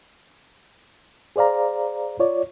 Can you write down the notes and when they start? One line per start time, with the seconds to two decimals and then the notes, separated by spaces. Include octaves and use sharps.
1.36 G#4 C5 D5 F5 A#5
2.19 F4 C#5 D5